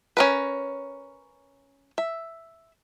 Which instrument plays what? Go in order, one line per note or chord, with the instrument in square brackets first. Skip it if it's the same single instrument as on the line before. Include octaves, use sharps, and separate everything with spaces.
[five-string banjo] C#4 A#4 B4
E5